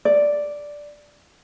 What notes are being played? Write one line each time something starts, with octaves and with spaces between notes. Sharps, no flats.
D5